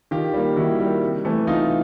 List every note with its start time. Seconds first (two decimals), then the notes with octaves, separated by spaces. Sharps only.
0.11 D#3 F4 G4
0.34 G3 A#3
0.56 D#3 E4 F#4
0.79 G3 A#3
1.02 C3
1.25 E3 A3
1.47 C3 D#4 F4